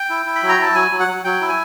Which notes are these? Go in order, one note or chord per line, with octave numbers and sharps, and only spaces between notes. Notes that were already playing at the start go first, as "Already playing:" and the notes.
Already playing: G5
E4
E4
B5
F#3
A#5
E4 A5
F#3 G#5
F#3
F#5
F#3
F#3 G5
E4
G#5